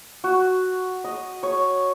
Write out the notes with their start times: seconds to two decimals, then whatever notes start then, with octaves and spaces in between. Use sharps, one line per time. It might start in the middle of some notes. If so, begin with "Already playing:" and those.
0.24 F#4
1.04 D#5
1.43 C#5